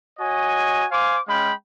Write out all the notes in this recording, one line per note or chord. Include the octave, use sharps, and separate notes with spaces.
F#4 C#5 D#5 G#5
C5 F5 G#5 D6
G#3 C#4 F5 G5 B5